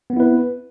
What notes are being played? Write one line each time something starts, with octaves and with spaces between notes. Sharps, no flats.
B3 C4 E4 B4